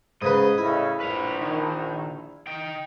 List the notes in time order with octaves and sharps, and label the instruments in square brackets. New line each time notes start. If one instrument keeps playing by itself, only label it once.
[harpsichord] G#2 C#3 B4 [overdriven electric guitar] D#5
[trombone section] A2 C#3 [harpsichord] E4
[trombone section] A#1 [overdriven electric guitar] B4 F5
[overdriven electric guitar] D#3
D#4 G5